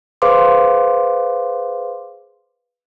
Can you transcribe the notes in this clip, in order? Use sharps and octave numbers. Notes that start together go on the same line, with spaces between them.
G#4 B4 C5 F5 C6 D6